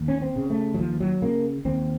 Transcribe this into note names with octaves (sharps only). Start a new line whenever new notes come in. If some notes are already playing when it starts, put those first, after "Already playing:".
Already playing: D#2
C#4
C4
C#3
A3
F#3
D#2 F3
F#3
C#3 A#3
D#2 C4